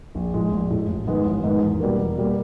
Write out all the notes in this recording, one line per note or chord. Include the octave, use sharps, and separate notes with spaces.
A#1
A2 F3 G#3
A#1
A2 F3 G#3
A1
G#2 D#3 G#3 B3
A1
G#2 D#3 G#3 B3
E2
B2 G3 A#3
E2
B2 G3 A#3